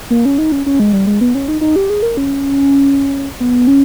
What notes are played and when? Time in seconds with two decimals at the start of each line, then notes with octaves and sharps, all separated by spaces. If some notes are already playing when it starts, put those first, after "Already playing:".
0.10 A#3
0.25 C#4
0.38 D#4
0.52 C#4
0.66 C#4
0.80 G#3
0.93 G3
1.07 G#3
1.21 B3
1.35 C#4
1.48 D#4
1.61 D#4
1.76 G4
1.90 G#4
2.02 A#4
2.17 C#4
3.40 B3
3.67 C#4